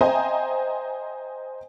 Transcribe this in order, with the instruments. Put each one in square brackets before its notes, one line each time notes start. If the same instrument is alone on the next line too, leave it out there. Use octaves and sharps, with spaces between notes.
[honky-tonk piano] C5 D#5 E5 G5 G#5 A#5